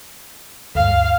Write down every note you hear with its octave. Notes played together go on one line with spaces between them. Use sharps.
D2 G2 F5